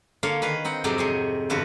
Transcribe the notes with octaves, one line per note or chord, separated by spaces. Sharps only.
D3 A#3 C#5 F5
D#3 B4 F5
C4 D#4 F#5
F2 G#2 C3 F#3 D#4 D5
C3 G#4 C#5
E2 G2 D3 F#4 B4